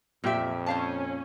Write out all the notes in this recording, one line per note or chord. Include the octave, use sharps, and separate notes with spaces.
F2 A#2 A#3 C4 G4 E5
C#4 C5 F5 A5